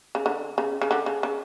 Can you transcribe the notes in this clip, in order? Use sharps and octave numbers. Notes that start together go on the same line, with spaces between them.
C#3
D3
C#3
C#3
D3
C#3
C#3